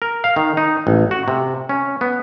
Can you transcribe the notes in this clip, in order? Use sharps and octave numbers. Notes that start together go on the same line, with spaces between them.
A#4
F5
D#3
D#4
A1
F#4
C3
C#4
B3